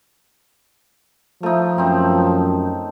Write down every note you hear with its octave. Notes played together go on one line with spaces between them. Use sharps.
F3 A3 D#4
F#2 C4 D#4